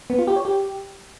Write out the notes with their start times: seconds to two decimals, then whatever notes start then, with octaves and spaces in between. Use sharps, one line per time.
0.10 B3
0.19 F4
0.27 G4
0.36 C#5
0.45 G4